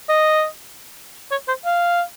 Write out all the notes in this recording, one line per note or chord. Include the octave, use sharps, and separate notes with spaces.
D#5
C#5
C5
F5